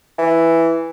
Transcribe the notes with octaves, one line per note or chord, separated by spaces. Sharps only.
E3